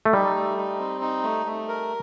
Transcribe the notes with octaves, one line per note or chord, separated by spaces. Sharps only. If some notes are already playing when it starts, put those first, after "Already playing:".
A3
G3 D#4
A3
D#4
C4
D#4
A3
A3
A#4